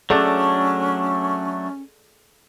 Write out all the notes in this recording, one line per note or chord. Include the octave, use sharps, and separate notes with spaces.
F#3 A3 C#4 D4 G#4 A4 D5